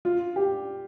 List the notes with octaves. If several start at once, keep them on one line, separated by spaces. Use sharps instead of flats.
F4
G4